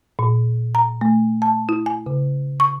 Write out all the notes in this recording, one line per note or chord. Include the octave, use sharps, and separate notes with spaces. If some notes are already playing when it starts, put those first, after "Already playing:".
A#2
A#5
A3
A5
E4
G#5
C#3
C#6